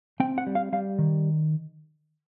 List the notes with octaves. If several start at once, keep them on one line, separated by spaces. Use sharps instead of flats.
C4 G5
F#5
G3
F5
G3 F5
D#3